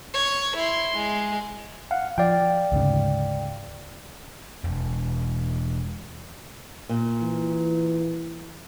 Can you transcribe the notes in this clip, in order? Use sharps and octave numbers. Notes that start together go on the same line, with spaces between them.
C#5
E4 C6
G#3
F5 F#5
F3 D5 F5 G5
D2 G#2 C#3
E1
A#2
E3